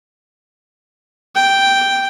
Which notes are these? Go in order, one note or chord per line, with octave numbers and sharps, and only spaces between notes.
G5